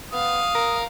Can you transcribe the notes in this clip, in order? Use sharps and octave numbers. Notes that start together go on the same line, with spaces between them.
B3 F5 D#6
A#4